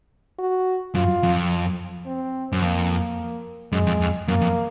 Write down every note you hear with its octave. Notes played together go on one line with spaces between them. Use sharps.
F#4
F#2 F4
F2
C4
F#2
F2 A#3
F#2 G#3
F2
F2
F#2 A#3
F2